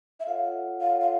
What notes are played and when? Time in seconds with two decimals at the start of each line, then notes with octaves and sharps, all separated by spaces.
0.20 E5
0.26 F4 A4 C#5 F5 F#5
0.81 F4 A4 C#5 F5 F#5
1.00 F5